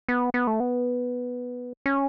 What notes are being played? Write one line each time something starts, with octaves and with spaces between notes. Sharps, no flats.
B3
B3
A3
B3
C#4